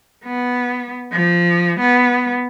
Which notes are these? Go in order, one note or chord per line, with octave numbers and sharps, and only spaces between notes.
B3
F3
B3